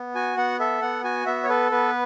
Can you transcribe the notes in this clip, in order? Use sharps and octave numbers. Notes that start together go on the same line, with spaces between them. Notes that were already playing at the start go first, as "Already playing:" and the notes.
Already playing: B3
F#4 G#5
B3 F#5
A4 E5
B3 F#5
F#4 G#5
B3 E5
C#5
A4 B4
B3 B4